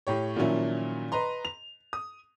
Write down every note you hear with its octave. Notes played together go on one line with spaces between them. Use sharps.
A2 G4 C#5
A#2 D#3 F3 F#3 C#4 E4
B4 D#5 A#5 C6
F7
D#6